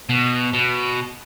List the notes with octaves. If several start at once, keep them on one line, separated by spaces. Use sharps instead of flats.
B2
B2